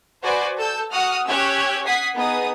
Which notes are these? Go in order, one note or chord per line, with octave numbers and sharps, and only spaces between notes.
F#4 B4 C5 D5 G#5
A4 A5 E6 G6
F#4 F#5 D#6 F6
C#4 G4 C#5 E6 F#6 G#6
F#5 D#6 G#6 B6 C7
B3 D#4 G#4 D#6